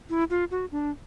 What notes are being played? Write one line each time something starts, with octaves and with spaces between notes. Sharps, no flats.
E4
F4
F#4
D4